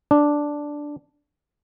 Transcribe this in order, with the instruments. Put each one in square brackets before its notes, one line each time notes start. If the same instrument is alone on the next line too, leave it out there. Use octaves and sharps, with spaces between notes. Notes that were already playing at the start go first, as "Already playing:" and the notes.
[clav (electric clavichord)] D4